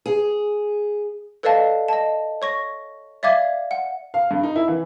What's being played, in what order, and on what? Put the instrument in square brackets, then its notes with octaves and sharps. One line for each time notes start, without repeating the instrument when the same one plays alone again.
[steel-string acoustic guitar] G#4
[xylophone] A4 B4 D5 D#5 F5 A5
D#5 A5
C#5 C#6 A#6
D5 E5 F5 D6 G#6
F#5
[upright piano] F5
G2
D#4
E4
E3